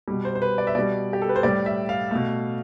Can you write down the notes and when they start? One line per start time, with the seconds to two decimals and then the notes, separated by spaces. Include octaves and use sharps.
0.08 B2 G3
0.25 C5
0.35 C5
0.42 B4
0.58 D5
0.67 E5
0.75 B2 G3 D5
1.13 G4
1.22 A4
1.29 B4
1.36 C5
1.43 A2 G3 D5
1.66 E5
1.89 F5
2.11 B2 A3